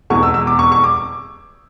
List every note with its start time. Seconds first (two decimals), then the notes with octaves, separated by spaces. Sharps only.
0.10 E2 B2 G#3 C#6
0.23 E6
0.34 E6
0.47 D6
0.59 C#6
0.72 C#6
0.84 D6